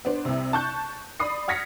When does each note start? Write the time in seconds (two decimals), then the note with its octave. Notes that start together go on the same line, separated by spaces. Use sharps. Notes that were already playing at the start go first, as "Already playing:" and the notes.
0.05 B3 D4 C5
0.25 C2 C3
0.53 A5 C#6 F#6 G6
1.20 D5 B5 D#6 C7
1.48 F#5 F6 G#6 A#6 B6 C#7